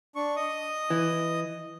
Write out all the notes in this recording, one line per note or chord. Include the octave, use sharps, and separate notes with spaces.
D4 C#6
D#5 D#6
E3